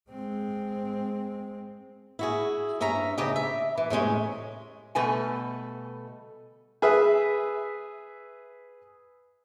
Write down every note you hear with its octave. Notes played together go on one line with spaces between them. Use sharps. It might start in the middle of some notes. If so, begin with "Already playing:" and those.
G#3 C4
E4 F#4 G#4
G2 C#4 E5 A#5
D2 C#3 G4 D#5
E5
E3
A2 C3 G#3 C#4
B2 G3 A3 B4 G#5
G#4 B4 E5